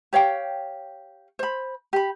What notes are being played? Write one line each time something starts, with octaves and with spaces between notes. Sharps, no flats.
G4 C#5 F5 G5
C5 B5
G4 B5